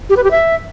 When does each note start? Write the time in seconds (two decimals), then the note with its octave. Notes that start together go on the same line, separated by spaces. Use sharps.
0.10 G4
0.17 B4
0.24 G4
0.31 E5